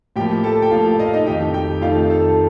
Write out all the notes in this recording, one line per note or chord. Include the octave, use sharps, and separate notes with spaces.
A2 F3 A#3 G4 G5
A4 A5
G5
A2 F3 A#3 F4 F5
D#5
F5
D#4 D#5
F2 D#3 A3 D#4 G4 G5
G4 G5
F2 D#3 A3 D#4 F4 F5
A4 A5